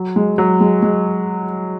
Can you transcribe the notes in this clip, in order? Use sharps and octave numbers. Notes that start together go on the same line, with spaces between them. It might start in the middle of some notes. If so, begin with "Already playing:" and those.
Already playing: F#3
G#3
F#3
G#3
G#3